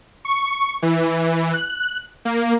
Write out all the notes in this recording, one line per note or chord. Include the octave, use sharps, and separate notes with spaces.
C#6
E3
F#6
A#3